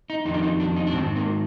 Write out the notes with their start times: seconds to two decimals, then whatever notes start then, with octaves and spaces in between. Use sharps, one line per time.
0.10 D#4
0.25 F2 D#3 D#4
0.34 D4
0.43 D#4
0.60 D4
0.76 D#4
0.87 D4
0.93 G#2 D#3 C4
1.16 A#3